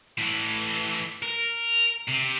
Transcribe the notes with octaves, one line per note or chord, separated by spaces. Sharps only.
A2 E3
A#4
C3